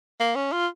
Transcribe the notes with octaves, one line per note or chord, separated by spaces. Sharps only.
A#3
C#4
F4